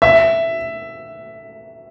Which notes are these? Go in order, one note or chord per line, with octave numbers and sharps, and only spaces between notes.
E5